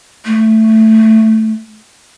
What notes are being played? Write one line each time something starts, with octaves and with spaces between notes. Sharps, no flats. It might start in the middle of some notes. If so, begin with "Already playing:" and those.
A3